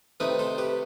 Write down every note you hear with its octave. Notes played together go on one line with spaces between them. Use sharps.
C3 D#3 A3 C4 B4 D#5
A4 C5
G4 B4